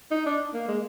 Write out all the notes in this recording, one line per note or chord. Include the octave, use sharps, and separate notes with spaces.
D#4
D4
A#3
G#3